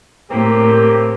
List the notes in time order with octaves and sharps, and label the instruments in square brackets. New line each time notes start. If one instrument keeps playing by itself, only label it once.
[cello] A2 [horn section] A#3 C4 G4